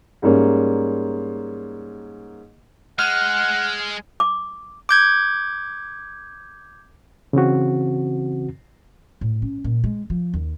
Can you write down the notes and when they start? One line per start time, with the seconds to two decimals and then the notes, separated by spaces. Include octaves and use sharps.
0.22 G#2 G3 A#3 C#4
2.99 G#3 F#5 F6
4.20 D6
4.89 D6 G6 G#6
7.33 C#3 E3 C4 F#4
9.21 A2
9.42 C#4
9.64 A#2
9.84 G#3
10.10 F3
10.34 D#2